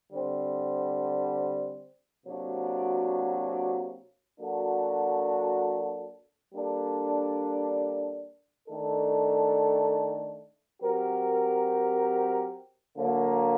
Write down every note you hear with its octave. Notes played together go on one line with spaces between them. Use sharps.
D3 G3 C4
C3 F#3 A#3 D4 F#4
F#3 A#3 D4 F#4 A4
G3 A#3 D4 A4
D#3 A3 D4 A4
F#3 C4 G4 A#4
D3 F#3 A#3